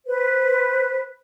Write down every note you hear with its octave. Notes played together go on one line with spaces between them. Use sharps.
B4 C5